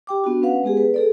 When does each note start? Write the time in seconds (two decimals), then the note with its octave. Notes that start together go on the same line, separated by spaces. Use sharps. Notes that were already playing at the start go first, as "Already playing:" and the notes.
0.07 G4 G5 D6
0.24 B3 D4 F#4
0.42 C#4 B4 F5 F#5
0.63 G#3 B3 G4 G#4
0.77 B4
0.94 G#4 A4 D5